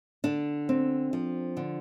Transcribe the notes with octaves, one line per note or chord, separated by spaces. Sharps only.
D3 D4
C4
F3
D3